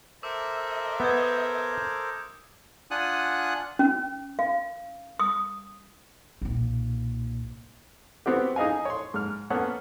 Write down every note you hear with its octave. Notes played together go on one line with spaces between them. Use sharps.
A4 A#4 C5 E5 D6 E6
B3 D#6 G6 G#6
D4 F4 F#5 G#5 D#6 F#6
C#4
F5
D#6
B1 A#2
B3 C4 F#4 G4
D#4 G#4 D#5 F5 G#5
C#5 C6
G#2 F6
A#3 B3 C#4 A4 C#5 F#5